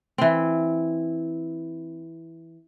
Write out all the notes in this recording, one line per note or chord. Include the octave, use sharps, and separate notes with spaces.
E3 C4